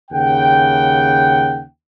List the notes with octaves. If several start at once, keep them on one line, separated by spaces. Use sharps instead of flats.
D#2 C#3 F#5 G5